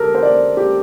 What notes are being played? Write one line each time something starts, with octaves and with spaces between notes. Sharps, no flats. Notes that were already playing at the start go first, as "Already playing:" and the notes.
Already playing: D3 G4 A4 A#4
C5
D5
G4